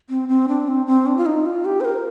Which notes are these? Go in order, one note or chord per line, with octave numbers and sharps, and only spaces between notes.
C4
C4
D4
C4
C4
D4
F4
D#4
F4
G4
C5
A#4